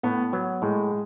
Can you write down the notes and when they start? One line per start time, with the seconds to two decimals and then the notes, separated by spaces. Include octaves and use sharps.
0.03 A2 B3
0.33 F#3 B3
0.62 A2 G#3